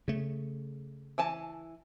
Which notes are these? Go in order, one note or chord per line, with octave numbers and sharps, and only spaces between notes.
C#3 A3
E3 G#5 A5